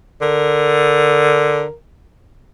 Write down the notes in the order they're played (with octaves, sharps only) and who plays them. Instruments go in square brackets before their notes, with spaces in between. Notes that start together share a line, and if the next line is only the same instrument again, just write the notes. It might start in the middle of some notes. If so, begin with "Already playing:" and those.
[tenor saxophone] D3 [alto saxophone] A#4